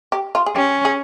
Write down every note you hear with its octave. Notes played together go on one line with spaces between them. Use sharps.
G4
F4
G#4
C#4 G4
G#4